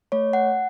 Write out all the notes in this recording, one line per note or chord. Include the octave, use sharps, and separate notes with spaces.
A3 C#5
F#5